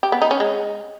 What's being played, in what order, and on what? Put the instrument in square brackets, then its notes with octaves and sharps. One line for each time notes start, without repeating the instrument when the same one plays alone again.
[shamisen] G4
B3
D#4
C#4
G#3